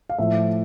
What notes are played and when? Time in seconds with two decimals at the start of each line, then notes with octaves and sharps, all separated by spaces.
0.10 F5
0.19 A2 F3 A3 E5